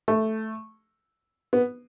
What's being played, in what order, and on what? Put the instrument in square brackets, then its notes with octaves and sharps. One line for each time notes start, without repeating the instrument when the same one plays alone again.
[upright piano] A3
B3